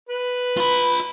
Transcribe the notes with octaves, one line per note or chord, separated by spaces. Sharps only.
B4
F4 B5